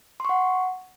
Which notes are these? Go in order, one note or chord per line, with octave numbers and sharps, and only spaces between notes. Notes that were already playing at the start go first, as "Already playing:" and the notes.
F#5 C6 C#6